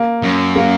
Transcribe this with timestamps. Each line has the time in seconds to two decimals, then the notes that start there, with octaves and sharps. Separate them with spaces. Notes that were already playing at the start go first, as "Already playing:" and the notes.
Already playing: A#3
0.23 F#2
0.56 A#3